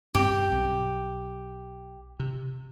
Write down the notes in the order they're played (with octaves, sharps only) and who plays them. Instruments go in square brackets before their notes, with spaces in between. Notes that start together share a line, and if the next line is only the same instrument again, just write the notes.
[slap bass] G2 C4 [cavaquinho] G4
[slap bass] B1
C3